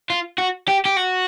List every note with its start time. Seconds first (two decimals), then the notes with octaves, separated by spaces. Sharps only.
0.10 F4
0.38 F#4
0.68 G4
0.85 G4
0.97 F#4